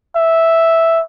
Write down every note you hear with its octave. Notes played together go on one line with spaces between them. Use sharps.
E5